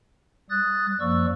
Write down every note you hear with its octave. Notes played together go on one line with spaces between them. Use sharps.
G3 D#6 F#6 A6
F#2 F3 A#3 D5 C#6 E6